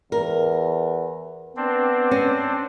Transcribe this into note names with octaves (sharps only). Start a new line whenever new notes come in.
E2 A#4
B3 C4 D4
C#4